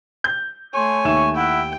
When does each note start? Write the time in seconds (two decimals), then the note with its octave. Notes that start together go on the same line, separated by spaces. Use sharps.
0.24 G6
0.74 A3 C#5 G#5 C6
1.05 D#2 E5 C#6 E7
1.36 E4 F#5 G5